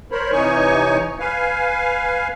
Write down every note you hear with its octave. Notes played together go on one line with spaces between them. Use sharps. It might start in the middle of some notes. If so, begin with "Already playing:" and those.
A#4 C5 C#5 B5
C3 E3 D#4 C#5 G#5 C#6
B4 F5 G#5